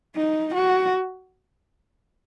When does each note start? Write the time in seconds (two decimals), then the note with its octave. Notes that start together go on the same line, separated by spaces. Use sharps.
0.16 D#4
0.55 F#4